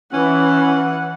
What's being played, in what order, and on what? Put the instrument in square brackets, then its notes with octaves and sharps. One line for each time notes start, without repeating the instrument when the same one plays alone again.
[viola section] E3 [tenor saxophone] C#4 [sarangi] F#5